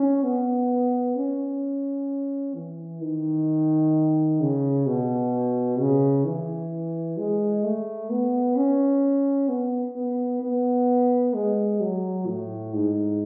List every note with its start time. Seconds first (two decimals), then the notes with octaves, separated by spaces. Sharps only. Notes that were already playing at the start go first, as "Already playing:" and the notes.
Already playing: C#4
0.23 B3
1.16 C#4
2.55 E3
3.01 D#3
4.41 C#3
4.87 B2
5.79 C#3
6.25 E3
7.18 G#3
7.64 A3
8.10 B3
8.56 C#4
9.49 B3
9.96 B3
10.42 B3
11.34 G#3
11.81 F#3
12.26 A2
12.74 G#2